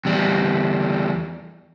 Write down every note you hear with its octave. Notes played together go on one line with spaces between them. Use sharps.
E2 G3